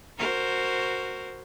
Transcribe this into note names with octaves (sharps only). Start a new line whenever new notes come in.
F#4 A#4 C5